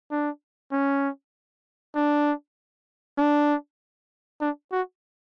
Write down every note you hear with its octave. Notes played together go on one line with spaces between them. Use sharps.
D4
C#4
D4
D4
D4
F#4